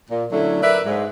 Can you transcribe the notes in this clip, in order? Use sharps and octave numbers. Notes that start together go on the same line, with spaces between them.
A#2
D3 F#3 A3 C#4 D4 E4
A#4 B4 D5 E5
G#2